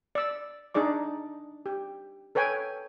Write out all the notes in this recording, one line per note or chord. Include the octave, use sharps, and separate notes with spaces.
D5 E6
D4 D#4 G#4 D5 D6
G4
A4 B4 C#5 G5 G#5